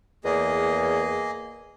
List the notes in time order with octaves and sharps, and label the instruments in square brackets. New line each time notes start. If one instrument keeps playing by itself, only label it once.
[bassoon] E2 [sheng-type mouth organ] A#3 G#4 D#5